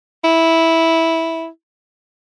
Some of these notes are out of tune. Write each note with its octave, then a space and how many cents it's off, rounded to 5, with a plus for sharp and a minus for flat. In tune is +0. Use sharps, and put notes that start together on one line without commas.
E4 -10